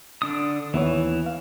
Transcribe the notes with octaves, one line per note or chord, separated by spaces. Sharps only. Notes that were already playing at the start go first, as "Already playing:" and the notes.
D3 D4 D#6
D#2 E3 B3 C#5
F5